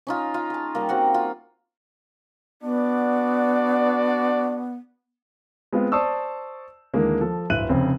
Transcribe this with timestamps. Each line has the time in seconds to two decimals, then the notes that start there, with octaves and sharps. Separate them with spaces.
0.07 C#4 D#4 F4
0.34 F4
0.50 G#4 A5
0.75 G3 A#3
0.89 G3 C4 F#4 F#5
1.14 F4
2.62 B3 D4 F#4 D5
5.72 G#3 B3 C4 F4
5.92 C5 D5 A5 C#6 D#6 E6
6.94 D#2 D3 E3 G#3 A#3
7.21 F3 A4
7.50 D1 G1 E5 F#6 D#7 F#7
7.69 F1 C#3 C4